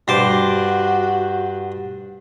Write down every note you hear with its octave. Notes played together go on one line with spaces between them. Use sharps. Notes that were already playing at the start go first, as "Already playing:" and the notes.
G2 F#4 C5 D6